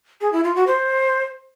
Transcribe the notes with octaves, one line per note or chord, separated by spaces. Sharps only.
G#4
E4
F4
F#4
C5